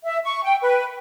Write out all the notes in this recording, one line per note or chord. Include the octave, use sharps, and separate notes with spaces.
E5
C#6
G5
B4